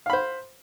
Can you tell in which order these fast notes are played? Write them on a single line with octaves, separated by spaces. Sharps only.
F5 B5 C5